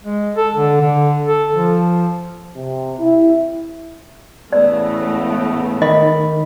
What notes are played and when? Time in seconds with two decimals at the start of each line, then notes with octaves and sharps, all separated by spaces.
0.03 G#3
0.36 A4
0.54 D3
0.81 D3
1.27 A4
1.55 F3
2.56 C3
2.99 E4
4.53 E2 A2 C#3 A3 B3 D5
5.82 D#3 D#5 B5